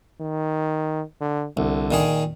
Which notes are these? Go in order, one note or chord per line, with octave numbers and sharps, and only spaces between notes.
D#3
D3
C2 D3
A#2 D#3 G#4